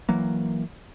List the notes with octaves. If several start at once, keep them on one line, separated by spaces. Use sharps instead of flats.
E3 F#3 A#3